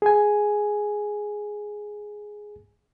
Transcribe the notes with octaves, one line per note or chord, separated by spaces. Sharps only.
G#4 G#5